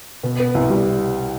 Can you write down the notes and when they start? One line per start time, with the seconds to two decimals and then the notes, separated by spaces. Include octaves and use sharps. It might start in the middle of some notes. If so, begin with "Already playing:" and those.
0.23 B2
0.39 B3
0.55 C2
0.70 G3